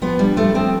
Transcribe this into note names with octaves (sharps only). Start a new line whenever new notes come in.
F3 B3
G2 G3
F3 A3
F3 C4